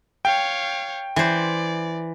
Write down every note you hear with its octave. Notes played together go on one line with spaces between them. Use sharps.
C#5 F5 G5
E3 C5 D5